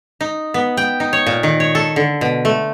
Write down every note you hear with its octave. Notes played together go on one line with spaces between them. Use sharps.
D#4
B3
G5
D#4
C#5
A#2
D#3
C#5
A4
D3
B2
A3